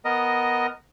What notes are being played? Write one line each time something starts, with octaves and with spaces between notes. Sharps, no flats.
B3 A#4 D#5